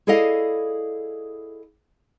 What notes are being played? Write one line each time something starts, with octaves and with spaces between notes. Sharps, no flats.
E4 G#4 A4 D5 D#5 F5